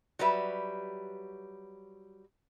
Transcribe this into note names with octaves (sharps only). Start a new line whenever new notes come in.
F#3 G3 B4 E5